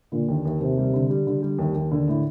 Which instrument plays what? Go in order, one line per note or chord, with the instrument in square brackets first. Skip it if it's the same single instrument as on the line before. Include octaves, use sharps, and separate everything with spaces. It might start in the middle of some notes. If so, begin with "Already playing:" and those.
[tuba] A#2 [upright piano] D3
[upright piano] D#2
D#2
[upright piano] D#2 [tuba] C3
[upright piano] G3
D3
G3
D3
G3
D#2
D#2
D3
A2